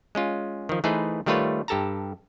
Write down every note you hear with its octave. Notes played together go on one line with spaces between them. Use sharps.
G#3 C#4 F4
D#3 F3
E3 A3 D#4 G#4 B4 C5
D#3 G3 A3 F4 B4 C#5
G2 G4 A4 A5 A#5